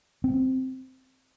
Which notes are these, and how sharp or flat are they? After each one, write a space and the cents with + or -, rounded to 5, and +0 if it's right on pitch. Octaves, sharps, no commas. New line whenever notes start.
C4 -5